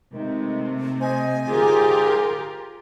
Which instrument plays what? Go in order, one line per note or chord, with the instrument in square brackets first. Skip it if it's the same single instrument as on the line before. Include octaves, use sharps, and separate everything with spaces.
[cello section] C3 A3 [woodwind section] D#3 G#3 D#4
[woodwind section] C5 D#5 [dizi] G#5
[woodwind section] G#2 D3 G#4 [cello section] F4 G4 A#4